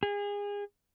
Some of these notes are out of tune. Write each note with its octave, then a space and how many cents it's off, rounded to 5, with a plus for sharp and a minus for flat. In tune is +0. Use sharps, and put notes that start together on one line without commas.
G#4 -30